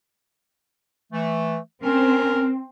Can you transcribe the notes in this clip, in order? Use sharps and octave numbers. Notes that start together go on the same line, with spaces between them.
E3 A3
C4 C#4 A#4